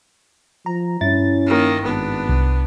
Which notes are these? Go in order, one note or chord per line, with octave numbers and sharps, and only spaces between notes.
F3 A#5
G2 C#4 E4 A6
D#3 A#3
G#1 B3 D4
C2